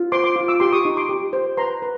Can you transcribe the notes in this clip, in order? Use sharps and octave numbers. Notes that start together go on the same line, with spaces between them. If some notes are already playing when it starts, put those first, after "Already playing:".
Already playing: F4
C5 C6 D6
C6 D6
F4
D6 E6
G4 C6 D6
C#6 D#6
D#4
C6 D6
G4
C5
B4 A#5 C6
B4